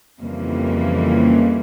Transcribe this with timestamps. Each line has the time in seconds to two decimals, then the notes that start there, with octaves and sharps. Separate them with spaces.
0.22 F2 C#3 E3 G3 A#3